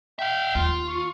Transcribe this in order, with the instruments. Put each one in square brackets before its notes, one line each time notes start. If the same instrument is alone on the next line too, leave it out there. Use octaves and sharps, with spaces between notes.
[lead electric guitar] E5 F5 [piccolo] G5
[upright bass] D#2 [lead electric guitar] F4
[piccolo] C#6